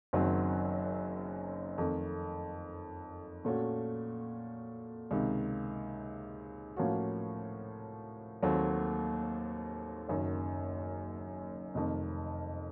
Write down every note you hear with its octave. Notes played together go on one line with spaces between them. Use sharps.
F#1 F#2 D#3 F#3 C4
F2 D#3 A3
A#2 A3 C#4 F#4
C#2 C3 D#3
A2 F3 A#3 C#4 F#4
D#2 D#3 F#3 A3 C4
F#1 F#2 D#3
F1 F2 D#3